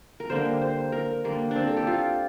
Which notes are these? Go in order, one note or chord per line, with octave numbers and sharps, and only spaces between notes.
A#4
D3 G3 A#3 C5
C5
A#4
D3 G3 A#3
C4 D4
A4
G4
F4